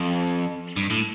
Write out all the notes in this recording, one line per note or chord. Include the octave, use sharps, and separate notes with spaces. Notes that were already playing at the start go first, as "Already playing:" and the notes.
Already playing: F2
G2
A2